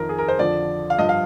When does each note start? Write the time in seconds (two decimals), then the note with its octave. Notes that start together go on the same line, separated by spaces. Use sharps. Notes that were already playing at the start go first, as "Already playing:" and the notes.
Already playing: F2 D#3 A#4
0.09 G#4
0.18 A#4
0.28 C5
0.38 F2 D3 F3 D5
0.90 F5
0.98 G2 F3 D#5
1.09 F5